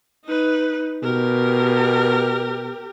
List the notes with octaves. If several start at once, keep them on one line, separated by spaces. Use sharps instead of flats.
D#4 B4
B2 G4 A#4